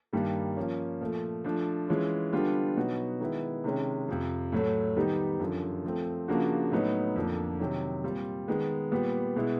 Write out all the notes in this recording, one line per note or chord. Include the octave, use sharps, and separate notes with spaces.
G2 D#3 G3 A#3
F3 A#3 C#4
A#2 F3 A3
F3 A3 D4
E3 G#3 C#4 F4
D3 G3 B3 D4 F4
B2 F#3 B3 D#4 F#4
D#3 G#3 B3 E4
C3 D#3 G#3 C#4
F2 C3 F3
A2 F#3 A3
D#3 G3 B3 D#4 G4
F#2 D3 F3
F3 A3 C4
C#3 F3 A#3 D4 F#4
A2 F#3 B3 D#4
F2 D3 F3 A#3 D4
C3 D#3 F#3
A#2 G3 C4 F4
D#3 G#3 B3
A#2 G3 B3
B2 G#3 B3 E4